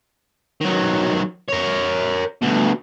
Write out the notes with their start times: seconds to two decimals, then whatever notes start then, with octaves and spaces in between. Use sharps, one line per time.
0.61 D#3 F#3
1.49 A#4 C#5
2.42 D2 B2